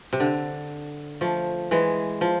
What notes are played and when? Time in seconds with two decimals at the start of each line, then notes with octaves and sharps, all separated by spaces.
0.13 C3
0.20 D3
1.21 F3 A3
1.71 E3 G#3
2.21 F3